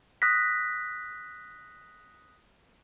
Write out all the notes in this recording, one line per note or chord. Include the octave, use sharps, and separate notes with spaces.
D#6 F#6 A#6 B6